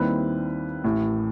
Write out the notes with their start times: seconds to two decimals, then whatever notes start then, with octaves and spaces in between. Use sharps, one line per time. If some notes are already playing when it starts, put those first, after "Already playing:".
Already playing: D#2 D#3 G3 C4 E4 B4
0.84 A1 A2 E3